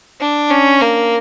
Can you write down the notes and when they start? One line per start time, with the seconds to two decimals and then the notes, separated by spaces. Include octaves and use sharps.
0.21 D4
0.51 C#4
0.81 A#3